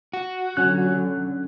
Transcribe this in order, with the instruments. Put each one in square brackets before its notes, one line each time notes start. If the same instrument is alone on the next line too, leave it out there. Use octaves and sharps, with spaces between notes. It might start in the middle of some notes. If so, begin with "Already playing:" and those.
[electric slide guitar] F#4
[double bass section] D3 F#3 [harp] C#4 [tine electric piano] F#6